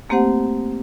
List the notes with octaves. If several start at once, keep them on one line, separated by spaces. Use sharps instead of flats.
A3 A#3 C4 G4 C5 F#5